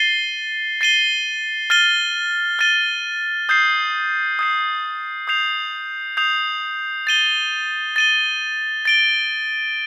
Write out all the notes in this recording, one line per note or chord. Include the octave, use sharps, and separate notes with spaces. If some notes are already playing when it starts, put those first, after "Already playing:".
Already playing: A6 C7 D#7 G7
A6 C7 D#7 G7
F6 A6 D#7 G7
F6 A6 D#7 G7
D#6 G6 C7
D#6 G6 C7
D#6 G6 C7 F7
D#6 G6 C7 F7
A6 D#7 G7
A6 D#7 G7
A6 D7 G7